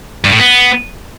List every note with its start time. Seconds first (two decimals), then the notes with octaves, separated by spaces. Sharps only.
0.24 G2
0.32 A2
0.39 B3